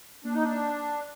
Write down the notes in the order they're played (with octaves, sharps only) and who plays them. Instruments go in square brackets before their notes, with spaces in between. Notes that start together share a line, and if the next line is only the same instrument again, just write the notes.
[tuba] A#3 [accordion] D4
[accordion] D#4
D4